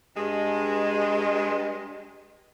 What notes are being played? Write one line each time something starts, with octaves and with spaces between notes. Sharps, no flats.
G2 G#3